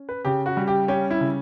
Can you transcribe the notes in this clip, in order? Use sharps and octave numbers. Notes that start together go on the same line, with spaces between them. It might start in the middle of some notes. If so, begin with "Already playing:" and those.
Already playing: C#4
B4
C#3 G4
F#4
G3
G4
C#4 G4
E4
C#3